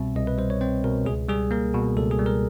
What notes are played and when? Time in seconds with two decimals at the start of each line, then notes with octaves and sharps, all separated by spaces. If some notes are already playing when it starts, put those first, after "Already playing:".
Already playing: C2 B2 G3 C4 E5
0.15 C2 D#5
0.27 B4
0.38 G3 C5
0.50 C#5
0.61 C4 C5
0.84 B2 A#4
1.06 C#2 G#4
1.28 G3 G#4
1.51 A#3 A#4
1.74 B2
1.96 C#2 A4
2.11 G#4
2.19 G3
2.26 A#4